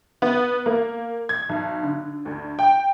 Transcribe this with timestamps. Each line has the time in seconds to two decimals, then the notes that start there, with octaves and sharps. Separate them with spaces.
0.22 B3
0.66 A#3
1.29 G#6
1.49 B1
1.83 D3
2.25 D2
2.59 G5